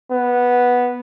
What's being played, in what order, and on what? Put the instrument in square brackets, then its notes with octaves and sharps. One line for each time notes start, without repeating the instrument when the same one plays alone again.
[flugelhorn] B3